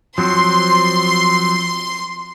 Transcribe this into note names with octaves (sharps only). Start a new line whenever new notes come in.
F3 F#3 C4 C6